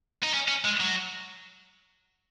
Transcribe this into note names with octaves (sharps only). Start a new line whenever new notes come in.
D#4
C#4
C#4
G#3
F#3